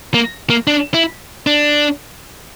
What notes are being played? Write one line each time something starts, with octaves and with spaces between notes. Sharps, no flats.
A#3
A#3
D4
E4
D4